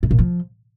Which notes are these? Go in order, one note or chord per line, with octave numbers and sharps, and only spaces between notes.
A2
A#2
F3